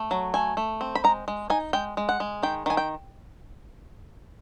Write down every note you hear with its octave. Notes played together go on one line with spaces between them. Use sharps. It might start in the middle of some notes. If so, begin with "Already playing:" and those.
Already playing: A3
F#3
A3 G#5
A3
C4
B5
G#3 A#5
G#3
D#4 G#5
G#3 G5
G#3
F#5
G#3
D#3 G5
D#3 G#5
G5